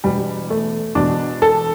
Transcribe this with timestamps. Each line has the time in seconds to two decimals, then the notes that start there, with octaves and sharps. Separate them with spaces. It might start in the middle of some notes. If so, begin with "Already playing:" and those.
0.04 E1 E2 B2 G3
0.50 A3
0.95 E1 E2 B2 D4
1.42 A4